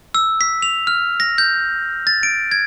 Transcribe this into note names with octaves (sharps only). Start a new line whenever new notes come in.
E6
B6
F7
F6
A#6
G6
A6
D7
G#6